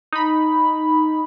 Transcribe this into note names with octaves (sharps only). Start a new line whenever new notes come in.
D#4 B5